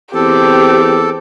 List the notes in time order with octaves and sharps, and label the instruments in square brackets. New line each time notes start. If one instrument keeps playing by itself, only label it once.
[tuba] E2 [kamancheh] C4 D6 [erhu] G4 [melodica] A4